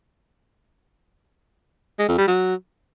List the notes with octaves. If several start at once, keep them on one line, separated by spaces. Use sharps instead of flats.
G#3
F2
G3
F#3